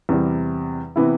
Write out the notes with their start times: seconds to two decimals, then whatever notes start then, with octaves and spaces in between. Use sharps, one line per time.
0.09 E2 C3 G3
0.96 C3 E3 B3 E4